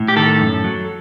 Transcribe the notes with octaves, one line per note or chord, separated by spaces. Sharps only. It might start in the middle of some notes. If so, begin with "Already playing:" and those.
Already playing: A2
G4
D#3 A4
F#2
F#3